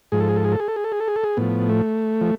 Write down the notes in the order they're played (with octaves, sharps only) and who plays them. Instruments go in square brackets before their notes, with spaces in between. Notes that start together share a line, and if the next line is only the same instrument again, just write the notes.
[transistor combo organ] G#2 F3 G#4
A4
G#4
A4
G#4
A4
G#4
A4
G#4
A4
G#4
A4
G#4
A4
G#4
A2 F3 B3
A3
F3